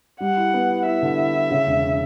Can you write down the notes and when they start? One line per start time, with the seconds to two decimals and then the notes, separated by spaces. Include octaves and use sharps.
0.20 G3 F#5
0.37 E4
0.54 B3
0.70 E4
0.86 E4 E5
1.02 D3
1.18 E4
1.34 E4
1.51 C#3
1.66 E1